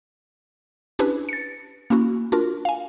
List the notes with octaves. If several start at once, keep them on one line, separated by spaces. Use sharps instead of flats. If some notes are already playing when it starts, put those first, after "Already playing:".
C#4 D4 E4 G4 B4
A6 C#7
A#3 C#4 E4 F#4
D4 F4 F#4 A#4
F5 G#5